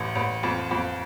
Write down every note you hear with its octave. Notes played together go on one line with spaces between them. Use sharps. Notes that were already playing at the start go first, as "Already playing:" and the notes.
Already playing: A1 A2
A1
F2
F2